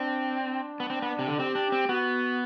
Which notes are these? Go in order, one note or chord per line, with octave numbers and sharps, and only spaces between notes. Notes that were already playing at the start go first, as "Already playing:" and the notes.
Already playing: C4 D4
D4
B3
C4
B3
C3
D3
C4 G4
D4
C4
B3 F#4